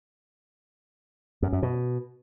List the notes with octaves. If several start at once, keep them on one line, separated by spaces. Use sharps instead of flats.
F#2
F#2
B2